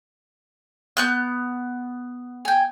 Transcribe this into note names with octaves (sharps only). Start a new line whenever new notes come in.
B3 F#6 G6
G5 G#5